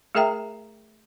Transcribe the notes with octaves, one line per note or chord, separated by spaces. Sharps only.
A3 G#4 A#4 E5 G5 A#5